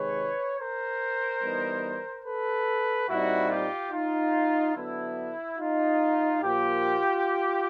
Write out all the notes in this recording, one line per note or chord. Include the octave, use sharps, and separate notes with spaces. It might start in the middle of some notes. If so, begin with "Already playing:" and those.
Already playing: C3 D#3 G#3 B4 C#5
A#4 C5
E3 G3 B3 D#4
A4 B4
A#2 G3 C4 D#4 E4 F#4
F4 G4
D#4 F4
D3 F#3 B3 D4 E4
D#4 F4
A#2 F3 A#3 F4 G4